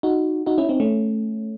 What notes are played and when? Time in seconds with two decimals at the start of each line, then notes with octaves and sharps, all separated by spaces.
0.03 D#4 F#4
0.46 D#4 F#4
0.58 C#4 E4
0.69 C4 D#4
0.80 A3 C#4